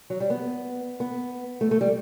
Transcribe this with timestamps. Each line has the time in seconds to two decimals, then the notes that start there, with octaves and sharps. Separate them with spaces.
0.10 F#3
0.20 G3
0.30 B3
1.00 B3
1.61 A3
1.71 A3
1.81 G3